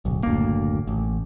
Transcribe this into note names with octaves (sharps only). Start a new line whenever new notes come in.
D1 B1
F#1 D2 A2 A#3
A1